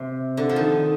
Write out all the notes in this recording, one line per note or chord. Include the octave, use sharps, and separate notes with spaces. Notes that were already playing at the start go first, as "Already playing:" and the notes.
Already playing: C3
D3
F3
D#3